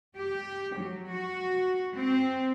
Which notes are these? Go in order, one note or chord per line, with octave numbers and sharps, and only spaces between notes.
G4
F#3
F#4
C4